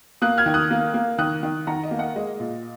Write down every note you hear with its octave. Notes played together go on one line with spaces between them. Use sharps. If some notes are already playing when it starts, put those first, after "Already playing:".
A#3 D#6 F#6
F6 G#6
D#3
D#6 F#6
A#3
A#3
D#3 D#6 F#6
D#3
D#3 F#5 A#5
D#5
A#3
D#5 F#5
G#3 D#5
A#2